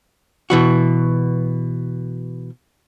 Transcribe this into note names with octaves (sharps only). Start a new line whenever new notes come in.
B2 E3 F#4